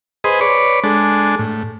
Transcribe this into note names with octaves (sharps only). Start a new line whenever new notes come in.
G#4 B4 C5 D#5
B4 C#5 D5
G#3 D4 A4
A2